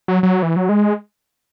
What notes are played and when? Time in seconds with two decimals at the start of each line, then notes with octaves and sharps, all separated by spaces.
0.08 F#3
0.23 F#3
0.43 E3
0.56 F#3
0.69 G#3